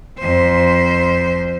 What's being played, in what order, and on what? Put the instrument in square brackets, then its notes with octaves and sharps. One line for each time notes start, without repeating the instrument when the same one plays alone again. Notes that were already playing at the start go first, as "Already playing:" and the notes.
[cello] F2 C5